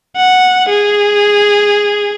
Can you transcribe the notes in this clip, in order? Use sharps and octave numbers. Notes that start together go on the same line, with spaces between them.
F#5
G#4